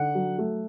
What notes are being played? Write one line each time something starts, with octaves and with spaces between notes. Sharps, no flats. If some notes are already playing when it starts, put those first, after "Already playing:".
Already playing: D3 F#5
F#3
A3